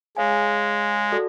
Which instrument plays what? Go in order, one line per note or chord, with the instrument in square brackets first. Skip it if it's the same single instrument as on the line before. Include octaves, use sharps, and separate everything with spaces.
[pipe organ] G#3 [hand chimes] G#4 C#5 F5 G#5
[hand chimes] F#4 A4 D5